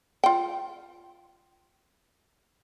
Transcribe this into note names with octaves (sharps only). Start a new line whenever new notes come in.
F4 G5